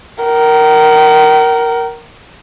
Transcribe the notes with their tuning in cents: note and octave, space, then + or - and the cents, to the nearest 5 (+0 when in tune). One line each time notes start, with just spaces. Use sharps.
A#4 +0 G5 -45